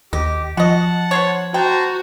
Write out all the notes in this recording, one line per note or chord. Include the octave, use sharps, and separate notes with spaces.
D#2 G4 D#5
F3 F#4 D#5 F#5 A5
B3 C5 C#5
F#4 C5 G5 A5 A#5